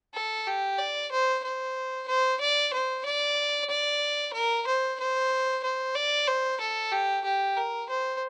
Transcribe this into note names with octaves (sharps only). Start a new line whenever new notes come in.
A4
G4
D5
C5
C5
C5
D5
C5
D5
D5
A#4
C5
C5
C5
D5
C5
A4
G4
G4
A#4
C5